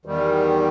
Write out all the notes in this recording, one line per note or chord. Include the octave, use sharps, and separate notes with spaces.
E2 D#3 G3